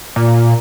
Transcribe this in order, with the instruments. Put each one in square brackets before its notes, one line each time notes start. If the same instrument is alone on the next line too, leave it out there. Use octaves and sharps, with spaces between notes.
[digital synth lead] A#2